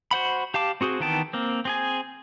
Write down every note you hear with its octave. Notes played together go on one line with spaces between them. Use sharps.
F#4 C5 F#5 B5
G4 F5 A5 D6
C4 F#4 G#4 C5
D#3 E3 B3 G5 A5
A#3 C4
C4 G#4 G#5